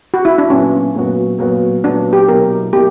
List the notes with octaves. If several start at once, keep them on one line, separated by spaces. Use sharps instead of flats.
F#4
E4
D4
A#2 F#3 B3 C#4 F#4
A#2 F#3 B3 F#4
A#2 F#3 B3 F#4
A#2 F#3 B3 D4 F#4
G4
B2 F#3 A#3 E4 A#4
B2 F#3 A#3 E4 G4